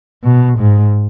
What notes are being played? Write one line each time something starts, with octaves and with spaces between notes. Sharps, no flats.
B2
G#2